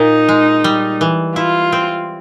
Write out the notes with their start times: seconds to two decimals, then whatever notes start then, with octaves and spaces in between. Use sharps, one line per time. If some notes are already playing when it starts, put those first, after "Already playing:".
Already playing: A#2 D#4
0.29 G#3
0.64 G3
1.01 E3
1.36 E4 F4
1.72 C4